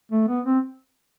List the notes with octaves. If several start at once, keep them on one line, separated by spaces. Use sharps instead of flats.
A3
B3
C4